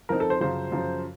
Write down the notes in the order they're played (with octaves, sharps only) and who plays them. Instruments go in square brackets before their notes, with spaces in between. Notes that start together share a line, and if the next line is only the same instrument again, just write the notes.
[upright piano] F3 C4 D#4 [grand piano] A#4
[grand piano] A4
C5
[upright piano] F#2 C#3 F3 [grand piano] C5
[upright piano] F#2 C#3 F3